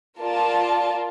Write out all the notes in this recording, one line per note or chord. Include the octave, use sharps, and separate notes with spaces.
F4 A#4 D5 A5